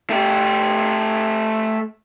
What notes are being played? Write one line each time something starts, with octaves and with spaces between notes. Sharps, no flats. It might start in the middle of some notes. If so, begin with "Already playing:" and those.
A3 G4